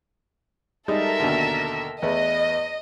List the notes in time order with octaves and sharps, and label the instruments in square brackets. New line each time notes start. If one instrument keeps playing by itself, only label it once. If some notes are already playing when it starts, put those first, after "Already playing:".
[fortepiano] G3 G#3 D#4 [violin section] A4 A#4 E5
[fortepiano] D#2 B2 D3
[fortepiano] E2 A3 B4 [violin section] D#5